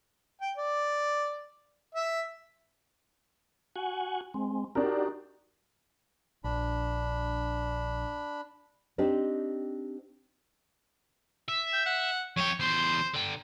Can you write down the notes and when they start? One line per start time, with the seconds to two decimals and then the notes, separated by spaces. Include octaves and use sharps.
0.41 G5
0.57 D5
1.95 E5
3.76 F#4 F#5 G#5
4.34 G#3 C4
4.75 D4 D#4 F#4 G4 A#4
6.44 A#1 D4 B5
8.98 C4 D4 D#4 G4
11.48 E5
11.73 G5
11.86 F#5
12.37 F2 C#5 G5
12.60 E2 C5 C6
13.14 D3 G5